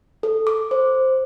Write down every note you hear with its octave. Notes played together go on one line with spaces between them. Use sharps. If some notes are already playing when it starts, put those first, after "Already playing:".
A4
D6
C5